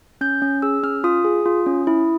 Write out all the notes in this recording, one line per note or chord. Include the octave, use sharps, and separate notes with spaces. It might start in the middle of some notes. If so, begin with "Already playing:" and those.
C#4 G6
C#4
G#4 E6
C#4 F6
F4 D#6
G#4
F4
C#4
E4